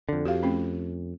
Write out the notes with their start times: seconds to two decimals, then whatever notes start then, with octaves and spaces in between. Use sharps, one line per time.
0.09 F2 D3
0.25 F2 F#4 G4 F5
0.43 A3 C4 C#4